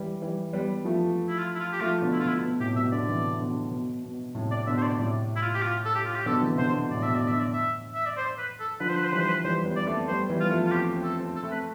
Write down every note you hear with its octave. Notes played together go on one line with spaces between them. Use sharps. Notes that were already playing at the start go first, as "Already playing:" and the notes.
Already playing: E3 G3
E3 G3
G3 B3
F3 A3
E4
F4
E4
F4
G4
F3 A3 F4
B2 D3
E4
F4
B2 E4
B2
A2 C3 G4
B2 E5
B2 D3 D5
C3 E3
B2 D3
B2
B2
A2 C3
D5
B2 D3 E5
C5
D5
A2 C3 D5
E4
F4
G4
F4
A4
G4
F4
G4
B2 D3 A4
C3 E3
B2 D3 C5
B2
A2 D5
B2 E5
D5
B2 D3
E5
D5
E5
E5
D5
C5
B4
A4
D3 F3 B4
C5
B4
C5
E3 G3 B4
C5
B4
E3 G3 C5
G3 B3
D5
A3 C4
G3 B3 C5
E3 G3
B3 F4
F3 A3
F4
C4 G4
C4
A4
C4
A4
A3 C4
B4